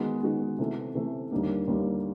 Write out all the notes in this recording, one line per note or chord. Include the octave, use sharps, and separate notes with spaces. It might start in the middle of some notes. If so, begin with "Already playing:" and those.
Already playing: D#3 G#3 B3 D#4 F#4
D#3 G#3 B3 D#4 F#4
C3 E3 A3
C3 E3 A3
D#2 D3 G3 A#3 D#4
D#2 D3 G3 A#3 D#4